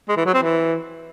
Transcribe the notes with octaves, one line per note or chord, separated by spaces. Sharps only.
G#3
E3
F#3
C4
E3